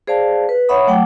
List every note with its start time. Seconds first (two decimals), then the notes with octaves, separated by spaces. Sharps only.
0.07 G#4 C5 D5 F5 A5
0.49 B4
0.69 C#5 E5 F#5 B5 C#6 D#6
0.87 F#3 A3 F#5 G5 A5 D6